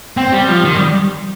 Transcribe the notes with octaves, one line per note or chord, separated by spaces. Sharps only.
C4
G3
F3
D#3
G3